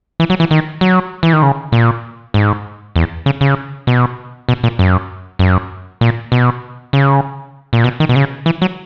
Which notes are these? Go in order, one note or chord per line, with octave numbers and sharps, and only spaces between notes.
E3
F#3
E3
D#3
F#3
E3
D#3
C#3
A#2
G#2
E2
C#3
C#3
B2
B2
A#2
F#2
F#2
A#2
B2
C#3
A#2
B2
D#3
B2
C#3
E3
F#3